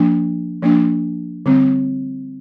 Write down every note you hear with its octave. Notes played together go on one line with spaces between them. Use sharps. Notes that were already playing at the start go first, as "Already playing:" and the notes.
Already playing: F3 A#3 D4
F3 A#3 D4
D3 G3 C4